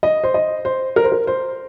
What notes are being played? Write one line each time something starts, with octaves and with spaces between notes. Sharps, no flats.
D#5
C5
D#5
C5
A#4
C5
A#4
C5